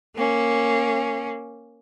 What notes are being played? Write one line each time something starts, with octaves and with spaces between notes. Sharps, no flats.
A#3 C#4